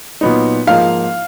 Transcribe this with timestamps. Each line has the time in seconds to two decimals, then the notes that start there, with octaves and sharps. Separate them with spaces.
0.21 A#2 F#3 B3 D#4
0.67 G#2 F3 A#3 D#4 F5